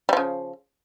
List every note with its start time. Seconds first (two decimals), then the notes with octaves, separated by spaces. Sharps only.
0.09 G3
0.13 F3
0.17 C#3